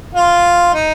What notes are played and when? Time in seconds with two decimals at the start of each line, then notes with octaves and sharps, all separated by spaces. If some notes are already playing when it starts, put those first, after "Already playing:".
0.15 F4
0.74 D#4